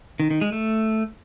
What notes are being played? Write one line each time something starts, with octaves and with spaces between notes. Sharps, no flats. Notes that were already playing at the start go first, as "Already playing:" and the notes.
D#3
D#3
G#3
A3